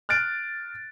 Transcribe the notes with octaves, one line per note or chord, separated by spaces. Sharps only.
F6 F#6 A6 D7